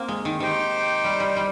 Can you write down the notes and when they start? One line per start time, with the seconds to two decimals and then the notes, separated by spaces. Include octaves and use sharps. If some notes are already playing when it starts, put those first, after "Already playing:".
Already playing: A#3 C4
0.08 G#3
0.25 D#3
0.40 D#3 D#4 G4 C5 G5
1.04 G3
1.20 G3
1.37 G3